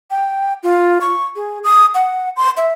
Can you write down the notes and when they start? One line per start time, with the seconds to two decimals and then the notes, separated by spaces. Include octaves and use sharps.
0.11 G5
0.63 F4
1.01 C#6
1.36 G#4
1.64 D#6
1.95 F#5
2.36 C6
2.57 E5